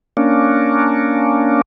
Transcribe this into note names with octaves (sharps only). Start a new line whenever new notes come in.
A#3 C#4 D4